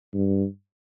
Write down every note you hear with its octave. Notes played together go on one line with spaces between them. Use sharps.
G2